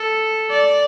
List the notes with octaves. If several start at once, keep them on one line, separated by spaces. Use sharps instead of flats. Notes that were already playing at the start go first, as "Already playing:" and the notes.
Already playing: A4
D5